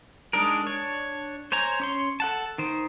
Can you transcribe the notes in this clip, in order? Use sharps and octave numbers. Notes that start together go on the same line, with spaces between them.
G#3 D4 D#4 G#4 A#4
D4 C#5
C5 C#5 G#5 A#5
C#4 C#5 C6
A4 F#5 A5
D#3 C5